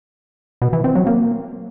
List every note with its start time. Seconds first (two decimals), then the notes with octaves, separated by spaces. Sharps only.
0.62 B2
0.73 E3
0.84 C4
0.95 F#3
1.07 A#3